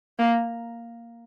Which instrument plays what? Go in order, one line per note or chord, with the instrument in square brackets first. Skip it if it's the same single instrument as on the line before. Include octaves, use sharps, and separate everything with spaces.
[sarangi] A#3